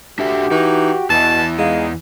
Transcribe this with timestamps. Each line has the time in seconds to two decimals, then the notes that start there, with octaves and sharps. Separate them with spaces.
0.19 D4 F#4 G4 A4 E5
0.51 E3 D#4
1.10 E2 B2 E3 A5
1.58 G#3 D#4 F5